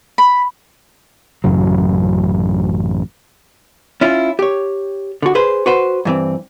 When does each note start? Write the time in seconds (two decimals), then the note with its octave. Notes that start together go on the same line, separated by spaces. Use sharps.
0.18 B5
1.44 A1 F#2 C#3 F#3
4.01 C#4 E4 F4
4.39 G4 C#5
5.22 D3 F#4
5.35 G#4 B4 C5
5.66 F#4 B4 C5
6.05 G2 E3 C4